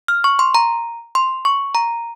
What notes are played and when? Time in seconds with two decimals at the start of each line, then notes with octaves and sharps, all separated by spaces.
0.08 F6
0.24 C#6
0.39 C6
0.55 A#5
1.15 C6
1.45 C#6
1.75 A#5